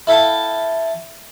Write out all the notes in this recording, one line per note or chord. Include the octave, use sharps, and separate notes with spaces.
E4 A4 F5 G5 A5